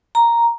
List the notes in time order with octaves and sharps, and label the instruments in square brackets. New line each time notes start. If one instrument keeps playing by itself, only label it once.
[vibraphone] A#5